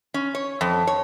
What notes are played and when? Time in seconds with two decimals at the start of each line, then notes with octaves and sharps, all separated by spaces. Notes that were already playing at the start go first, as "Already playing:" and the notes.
0.14 C#4
0.35 C#5
0.61 F2
0.87 C#5